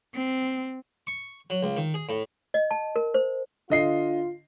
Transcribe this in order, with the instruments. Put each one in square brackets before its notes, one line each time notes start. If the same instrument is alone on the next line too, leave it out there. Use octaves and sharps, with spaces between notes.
[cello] C4
[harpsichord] C#6
F#3
C#2
D#3
G#4
A2
[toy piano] D#5
A5
A#4
C5
[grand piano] D3 D#5 C7 [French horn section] F4